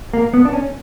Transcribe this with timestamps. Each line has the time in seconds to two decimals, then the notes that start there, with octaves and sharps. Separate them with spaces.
0.13 A#3
0.34 B3
0.45 D4
0.53 C#4